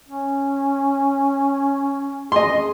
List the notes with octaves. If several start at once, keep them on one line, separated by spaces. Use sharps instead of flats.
C#4
G#4 D#5 C6